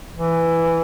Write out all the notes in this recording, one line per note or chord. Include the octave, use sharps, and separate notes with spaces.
E3